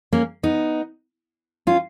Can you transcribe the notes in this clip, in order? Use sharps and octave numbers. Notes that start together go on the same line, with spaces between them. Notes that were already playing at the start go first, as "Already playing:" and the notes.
A#3 C#4
B3 D#4
C#4 F4